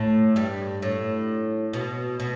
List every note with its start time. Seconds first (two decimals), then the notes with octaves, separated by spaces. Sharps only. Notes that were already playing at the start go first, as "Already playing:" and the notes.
Already playing: A2 A3
0.36 G2 G3
0.82 A2
1.73 B2
2.20 B2